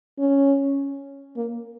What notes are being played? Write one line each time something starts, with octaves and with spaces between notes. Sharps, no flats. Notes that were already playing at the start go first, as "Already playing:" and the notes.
C#4
A#3